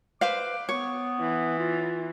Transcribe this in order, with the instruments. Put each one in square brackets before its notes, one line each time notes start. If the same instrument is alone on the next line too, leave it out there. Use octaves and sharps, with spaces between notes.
[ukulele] B4 C5 F5 [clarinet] D6
[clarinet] B3 [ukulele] C#5
[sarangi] E3
[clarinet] F4